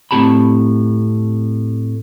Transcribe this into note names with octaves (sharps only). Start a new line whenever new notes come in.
A2 C4 G4 A5 B5